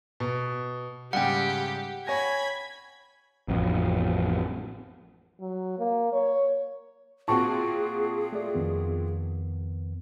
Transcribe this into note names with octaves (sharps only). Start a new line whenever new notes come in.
B2
G#2 C#3 G3 G4 F#5 G5
C#5 G#5 B5 G#6 A#6
A1 F2
F#3
A#3
C#5
A#2 C4 F#4 G#4 A5 C#6
A3 D5
F2 D#3 B3